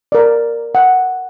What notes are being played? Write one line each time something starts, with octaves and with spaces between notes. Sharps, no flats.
A#4 D5
F#5